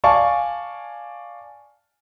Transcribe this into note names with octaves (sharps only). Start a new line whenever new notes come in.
D5 F5 G#5 A5 C#6